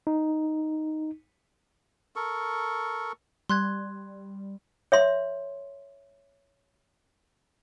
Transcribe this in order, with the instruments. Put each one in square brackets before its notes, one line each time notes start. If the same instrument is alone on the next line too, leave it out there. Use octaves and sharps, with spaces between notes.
[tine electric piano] D#4
[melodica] A4 A#4 C#6
[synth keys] G3 [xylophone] C6 F#6 G#6
[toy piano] C#5 E5 C6